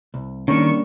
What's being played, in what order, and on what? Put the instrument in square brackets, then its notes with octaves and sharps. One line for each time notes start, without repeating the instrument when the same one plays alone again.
[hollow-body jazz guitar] C2
[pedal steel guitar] D#3 [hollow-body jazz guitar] G3 A#3 D4 [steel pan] C#4 [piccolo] C#6